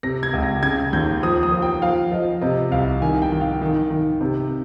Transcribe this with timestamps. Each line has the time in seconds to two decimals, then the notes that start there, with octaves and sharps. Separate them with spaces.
0.03 C3 A#6
0.23 G#6
0.33 C#2
0.43 A#6
0.63 C#3 G#6
0.93 D#2 G6
1.23 F3 D#6
1.43 D#6
1.52 F3
1.62 G5
1.82 F3 F5
2.11 F3 D#5
2.42 C3 D#5
2.71 C2 F5
3.02 D#3 G#5
3.22 G5
3.32 D#3
3.41 F5
3.61 D#3
3.91 D#3
4.21 C3